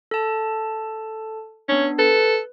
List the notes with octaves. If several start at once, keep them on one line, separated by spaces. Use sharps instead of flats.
A4 A5
B3 C#4 D4
A4 B4